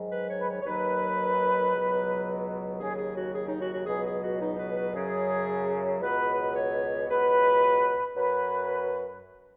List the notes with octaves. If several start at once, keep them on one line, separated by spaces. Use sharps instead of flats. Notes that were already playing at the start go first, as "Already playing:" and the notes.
Already playing: G#2 D#3 F#3
B4
C#5
B4
C#5
C#5
D#2 D#3 F#3 B4
C#2 B2 F#3
D#2 C#3 F#3 G#4
G#4
F#4
G#4
D#4
F#4
F#4
C#2 B2 F#3 G#4
G#4
F#4
D#4
B4
B4
F#2 C#3 F#3 G#4
C#2 B2 F#3 B4
C#5
C#2 B2 F#3 B4
F#2 F#3 B4